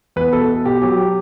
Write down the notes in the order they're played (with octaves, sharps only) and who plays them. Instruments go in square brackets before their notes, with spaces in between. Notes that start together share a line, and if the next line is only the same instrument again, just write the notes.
[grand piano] E2 B4
B2 A4
B2
B2 G4
F#3 G4